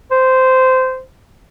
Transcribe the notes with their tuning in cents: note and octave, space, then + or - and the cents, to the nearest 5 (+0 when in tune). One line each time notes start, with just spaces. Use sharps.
C5 -15